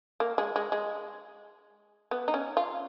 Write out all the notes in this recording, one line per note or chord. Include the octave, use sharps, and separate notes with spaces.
A#3
G#3
G#3
G#3
B3
D#4
C#4
F4